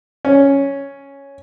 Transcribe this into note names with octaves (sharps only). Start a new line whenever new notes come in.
C#4